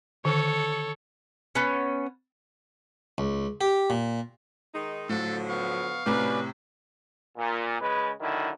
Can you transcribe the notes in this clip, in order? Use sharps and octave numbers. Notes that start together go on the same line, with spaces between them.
D3 D#3 A4 C#5
B3 C#4
C#2
G4
A#2
D#3 G#3 D#4
A2 D3 F3 F#3 A4
B3 F5 C#6
A2 C3 F#3 C#4 G4 B4 D5 B5
A#2
C#3 G#3 B4
D3 D#3 F#3 E4